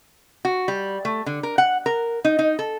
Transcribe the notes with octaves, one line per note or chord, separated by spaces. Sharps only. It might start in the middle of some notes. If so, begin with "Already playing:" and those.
F#4
G3
A3
D3
A#4
F#5
A#4
D#4
D#4
A4